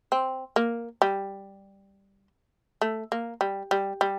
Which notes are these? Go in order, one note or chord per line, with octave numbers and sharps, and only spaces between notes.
C4
A#3
G3
A3
A#3
G3
G3
G3